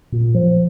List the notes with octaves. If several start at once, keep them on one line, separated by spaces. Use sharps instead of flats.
A#2
F3